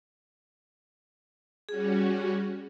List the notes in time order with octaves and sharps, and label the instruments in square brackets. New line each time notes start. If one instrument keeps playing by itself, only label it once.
[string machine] G3 C#4 F#4 [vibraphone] G#4